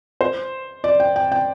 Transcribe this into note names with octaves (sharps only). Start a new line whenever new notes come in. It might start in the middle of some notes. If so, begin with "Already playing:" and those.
C5
D5
G5
G5
G5